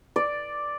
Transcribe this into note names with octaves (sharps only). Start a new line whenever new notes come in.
D5